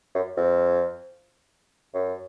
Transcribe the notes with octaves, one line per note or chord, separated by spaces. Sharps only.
F#2
F2
F#2